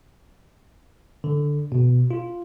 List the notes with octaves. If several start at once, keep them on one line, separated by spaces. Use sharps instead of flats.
D3
B2
F4